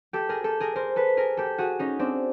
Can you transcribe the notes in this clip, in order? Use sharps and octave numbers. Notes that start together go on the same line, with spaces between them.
G4 A4
G#4 A#4
G4 A4
G#4 A#4
A#4 C5
A4 B4
G#4 A#4
G4 A4
F#4 G#4
C#4 D#4
C4 D4